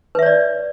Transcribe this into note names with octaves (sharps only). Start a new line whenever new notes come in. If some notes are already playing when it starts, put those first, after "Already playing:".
B4 C#5 D5 E5